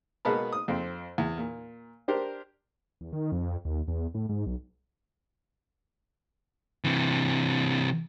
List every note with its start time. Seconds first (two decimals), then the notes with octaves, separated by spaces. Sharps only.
0.25 B2 G#3 A#3 B3 A5 B5
0.52 D#6
0.68 F2 C4
1.18 E2
1.38 A#2
2.08 D4 G4 A#4 C5
3.01 E2
3.13 D#3
3.32 F2
3.65 D#2
3.88 E2
4.14 A2
4.29 G#2
4.46 B1
6.84 C3 E3